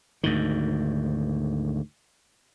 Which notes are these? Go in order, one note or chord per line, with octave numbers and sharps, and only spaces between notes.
D2 G#2 D#3